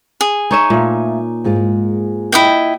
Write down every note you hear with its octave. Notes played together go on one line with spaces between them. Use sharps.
G#4
D#4 C#5 E5
A#2 A3 F5
G#2 G#3 F4
E4 D#5 G5